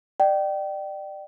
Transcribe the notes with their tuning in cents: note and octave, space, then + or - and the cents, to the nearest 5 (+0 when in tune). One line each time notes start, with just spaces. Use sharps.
D5 +30 G5 -25